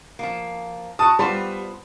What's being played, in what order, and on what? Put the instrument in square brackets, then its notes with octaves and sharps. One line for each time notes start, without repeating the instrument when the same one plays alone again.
[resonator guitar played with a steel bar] F3 A#3
[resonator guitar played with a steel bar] F#4 A5 [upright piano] D#6
[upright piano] G3 [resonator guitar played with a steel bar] B3 F4 C5